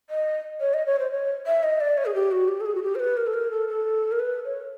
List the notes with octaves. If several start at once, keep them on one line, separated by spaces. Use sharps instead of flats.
D#5
C#5
D#5
C#5
C5
C#5
E5
D#5
D5
C#5
G#4
G4
F#4
G4
A4
G#4
F#4
G4
C5
B4
A#4
A4
A#4
A4
A4
A#4
B4
C#5